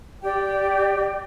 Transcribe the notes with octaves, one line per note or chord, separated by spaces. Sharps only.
G4 D5 G5